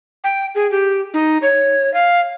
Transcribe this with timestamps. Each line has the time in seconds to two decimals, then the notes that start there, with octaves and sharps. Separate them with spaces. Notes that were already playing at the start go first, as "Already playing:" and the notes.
0.24 G5
0.55 G#4
0.71 G4
1.14 D#4
1.42 C#5
1.94 F5